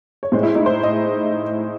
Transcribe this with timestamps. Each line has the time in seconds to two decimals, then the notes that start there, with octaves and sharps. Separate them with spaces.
0.23 C#5
0.32 A2 G#3 C5
0.43 E4
0.55 D#4
0.66 C5
0.83 D#5